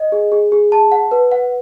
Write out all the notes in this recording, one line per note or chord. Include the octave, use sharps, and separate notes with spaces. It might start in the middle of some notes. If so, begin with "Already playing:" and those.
Already playing: D#5
G#4
G#4
G#4
A5
F#5
B4
F#5